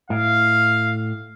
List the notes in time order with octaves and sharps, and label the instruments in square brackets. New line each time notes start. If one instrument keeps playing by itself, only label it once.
[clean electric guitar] A2 [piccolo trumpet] F5